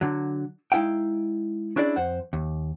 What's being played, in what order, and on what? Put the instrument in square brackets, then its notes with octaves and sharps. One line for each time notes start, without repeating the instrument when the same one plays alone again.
[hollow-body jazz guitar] D3 F#3
G#3 D#4 E4 F5 G5
C#4 D4 E4 G#4 D5
F2 C5 F#5
D#2